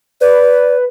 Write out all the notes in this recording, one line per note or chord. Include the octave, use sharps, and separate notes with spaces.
B4 D5